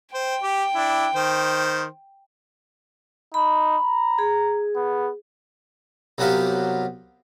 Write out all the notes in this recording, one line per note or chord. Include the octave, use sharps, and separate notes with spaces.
C5 G5
G4
D4 E4
D#3 C5
D#4 B5
A#5
G#4
B3
C2 F#3 B3 F#4 G4 F5